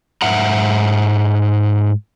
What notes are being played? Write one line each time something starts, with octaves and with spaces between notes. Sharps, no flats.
G#2 E5 F#5 A#5